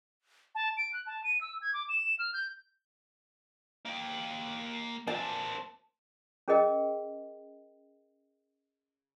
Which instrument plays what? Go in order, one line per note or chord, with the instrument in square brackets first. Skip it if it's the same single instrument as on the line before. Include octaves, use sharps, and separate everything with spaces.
[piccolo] A5
D7
F#6
A5
D#7
E6
G#6
D6
E7
F6
G6
[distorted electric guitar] A#3 G5
[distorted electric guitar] A#3 C4 [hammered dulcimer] A5
[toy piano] C#4 G#4 A#4 D#5 G5